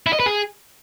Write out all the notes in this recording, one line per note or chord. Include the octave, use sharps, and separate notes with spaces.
E4
D#5
B4
G#4